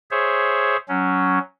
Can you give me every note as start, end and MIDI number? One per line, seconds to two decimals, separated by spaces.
0.11 0.77 68
0.11 0.77 72
0.11 0.77 73
0.11 0.77 76
0.88 1.39 54
0.88 1.39 61